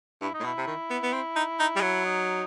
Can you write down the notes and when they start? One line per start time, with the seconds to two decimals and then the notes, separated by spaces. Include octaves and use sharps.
0.21 G2 E4
0.34 D#4
0.40 A2
0.44 B2 E4
0.58 C3
0.67 D#3
0.90 B3
1.03 B3
1.13 C4
1.36 D#4
1.60 D#4
1.76 G3
1.81 F#3
2.05 D#4